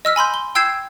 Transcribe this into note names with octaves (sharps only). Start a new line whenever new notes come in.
D#5 E6 F6 B6
G#5 B5 C6 G6
G7
G5 E6 G6 G#6 C7 E7